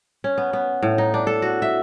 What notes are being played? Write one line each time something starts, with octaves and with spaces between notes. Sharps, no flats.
C#4
B3
B3
A2
D#4
D4
A4
F#4
E5